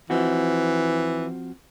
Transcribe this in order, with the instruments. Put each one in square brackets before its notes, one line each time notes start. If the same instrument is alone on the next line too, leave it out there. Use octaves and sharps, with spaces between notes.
[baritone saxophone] E3 [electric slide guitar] F3 C4 F#4